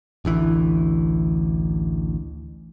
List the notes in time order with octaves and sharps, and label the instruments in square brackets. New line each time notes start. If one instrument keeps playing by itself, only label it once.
[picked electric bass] A1 D2 E3